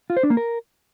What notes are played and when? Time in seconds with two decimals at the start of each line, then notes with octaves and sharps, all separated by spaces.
0.10 F4
0.17 C5
0.23 D4
0.30 A#3
0.37 A#4